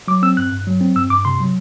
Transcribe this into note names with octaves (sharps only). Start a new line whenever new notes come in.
F#3 D6
C4 E6
G2 F#6
G2
F#3
C4
G2 E6
G2 D6
C3 C6
F#3